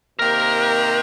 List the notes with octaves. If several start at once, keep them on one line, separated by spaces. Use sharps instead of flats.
C3 D#3 A#3 G4 A#4 C5